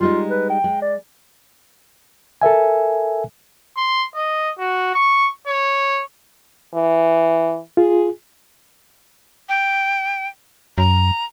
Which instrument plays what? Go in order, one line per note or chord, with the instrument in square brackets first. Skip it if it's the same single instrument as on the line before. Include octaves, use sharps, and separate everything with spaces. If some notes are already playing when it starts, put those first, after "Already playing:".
[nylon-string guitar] G3 G#3 D#4 [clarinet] F4
[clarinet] B4
G5
[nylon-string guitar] G#3
[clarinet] D5
[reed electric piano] A4 A#4 E5 G#5
[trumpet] C6
D#5
F#4
C#6
C#5
[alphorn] E3
[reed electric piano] F4 [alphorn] G#4
[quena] G5
[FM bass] F#2 [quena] A#5